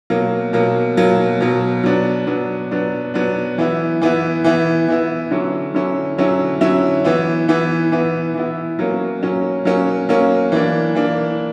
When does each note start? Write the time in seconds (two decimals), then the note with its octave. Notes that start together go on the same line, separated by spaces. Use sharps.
0.10 B2 F#3 A#3
0.53 B2 F#3 A#3
0.97 B2 F#3 A#3
1.40 B2 F#3 A#3
1.84 F#3 B3 D4
2.27 F#3 B3 D4
2.71 F#3 B3 D4
3.14 F#3 B3 D4
3.58 E3 B3 E4
4.02 E3 B3 E4
4.44 E3 B3 E4
4.88 E3 B3 E4
5.31 D3 F#3 C#4 E4
5.74 D3 F#3 C#4 E4
6.18 D3 F#3 C#4 E4
6.61 D3 F#3 C#4 E4
7.05 E3 B3 E4
7.48 E3 B3 E4
7.92 E3 B3 E4
8.35 E3 B3 E4
8.79 F#3 A#3 C#4
9.22 F#3 A#3 C#4
9.65 F#3 A#3 C#4
10.09 F#3 A#3 C#4
10.52 E3 A#3 D4
10.95 E3 A#3 D4